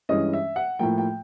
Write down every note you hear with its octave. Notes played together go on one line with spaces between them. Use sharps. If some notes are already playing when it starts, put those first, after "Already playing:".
G2 E3 G#3 C#4 D#5
E5
F#5
A2 F3 A#3 G5
G5